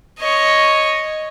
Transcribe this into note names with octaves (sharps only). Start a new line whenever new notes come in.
C#5 D#5